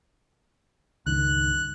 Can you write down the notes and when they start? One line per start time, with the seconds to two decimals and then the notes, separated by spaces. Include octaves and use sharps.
1.06 C#2 G2 D#3 F#6